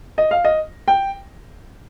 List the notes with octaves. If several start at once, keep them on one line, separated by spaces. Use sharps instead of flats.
D#5
F5
D#5
G5